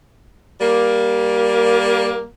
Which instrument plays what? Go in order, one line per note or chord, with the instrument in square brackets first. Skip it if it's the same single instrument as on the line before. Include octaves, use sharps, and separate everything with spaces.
[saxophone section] G3 A#3